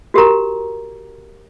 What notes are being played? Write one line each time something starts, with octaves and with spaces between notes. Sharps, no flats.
F#4 G4 A#4 A#5